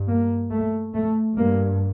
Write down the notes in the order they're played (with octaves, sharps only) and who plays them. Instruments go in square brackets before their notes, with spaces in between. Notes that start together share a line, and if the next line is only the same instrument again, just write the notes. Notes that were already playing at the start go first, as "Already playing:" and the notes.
Already playing: [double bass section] G2
A#3
A3
A3
G2 A#3